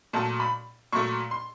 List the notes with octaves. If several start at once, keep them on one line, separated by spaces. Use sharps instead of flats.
A#2 F#3 A3 A5
B5
A#2 F#3 A3 C#6
C6